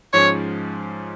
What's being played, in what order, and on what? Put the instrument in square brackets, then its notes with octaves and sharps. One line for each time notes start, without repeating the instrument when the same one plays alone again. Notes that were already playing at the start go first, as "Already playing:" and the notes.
[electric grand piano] G#2 F3 G#3 C#4 [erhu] C#5